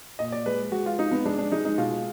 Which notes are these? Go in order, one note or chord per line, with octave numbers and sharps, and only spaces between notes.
A#2 D#5
D5
G#3 B4
G#3 F#4
F4
G#3 D#4
B3
G#3 D4
D4
G#3 D#4
D#4
B2 F4